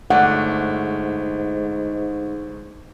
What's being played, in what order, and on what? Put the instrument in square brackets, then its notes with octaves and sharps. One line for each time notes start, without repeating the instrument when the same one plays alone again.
[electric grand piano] G1 A3 D5 [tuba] G#2 [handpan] F#5